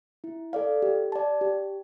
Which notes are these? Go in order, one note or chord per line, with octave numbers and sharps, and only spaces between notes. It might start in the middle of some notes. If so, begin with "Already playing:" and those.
E4
A4 D5 F5
G4
D5 A5
G4